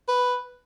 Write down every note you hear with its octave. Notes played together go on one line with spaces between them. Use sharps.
B4